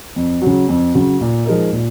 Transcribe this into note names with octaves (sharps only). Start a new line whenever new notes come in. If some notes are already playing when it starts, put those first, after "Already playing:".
F2
C#3 F#3
F2
C#3 F#3
A#2
F3 G#3 D#4 A#4
A#2